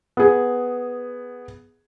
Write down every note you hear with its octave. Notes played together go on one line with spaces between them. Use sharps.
B3 G#4